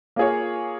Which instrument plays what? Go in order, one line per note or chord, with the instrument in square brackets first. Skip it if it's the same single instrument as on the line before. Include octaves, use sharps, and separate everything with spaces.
[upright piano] A#3 F4 G#4 C#5